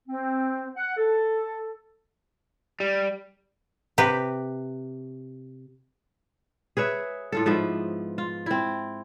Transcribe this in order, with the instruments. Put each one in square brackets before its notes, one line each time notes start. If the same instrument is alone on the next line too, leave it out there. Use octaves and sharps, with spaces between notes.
[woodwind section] C4
F#5
A4
[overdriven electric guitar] G3
[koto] C3 G4 B4
[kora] G#4 B4 C#5 E5
A2 F4 A4
G#2 F3 B3 E5
F4
C4 E4